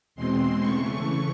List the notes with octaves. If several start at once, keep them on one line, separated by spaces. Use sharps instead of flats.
E2 B2 G#3 C4 C6
C#3 E3 A3 C#6